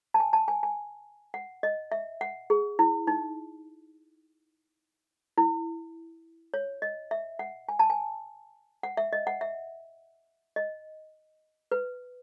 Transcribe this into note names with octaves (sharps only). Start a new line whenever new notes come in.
A5
G#5
A5
G#5
G#5
F#5
D#5
E5
F#5
G#4
E4
D#4
E4
C#5
D#5
E5
F#5
G#5
A5
G#5
F#5
E5
D#5
F#5
E5
D#5
B4